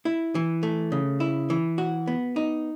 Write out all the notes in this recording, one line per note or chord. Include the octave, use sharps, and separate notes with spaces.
E4
E3
A3
C#3
E4
E3
F#4
B3
D#4